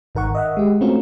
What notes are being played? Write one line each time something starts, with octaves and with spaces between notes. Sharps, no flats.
G#1 D#3 A#4 F#5 C#6
D#5 E5 F#5
G#3 G4
A3 C4 C#4 F4 F#4 A#4